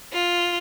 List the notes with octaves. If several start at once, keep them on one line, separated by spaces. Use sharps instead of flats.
F4